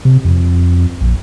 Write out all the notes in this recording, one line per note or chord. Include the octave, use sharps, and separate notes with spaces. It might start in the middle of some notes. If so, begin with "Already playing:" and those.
C3
F2
A#1